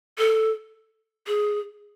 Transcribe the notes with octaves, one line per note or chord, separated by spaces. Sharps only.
A4
G#4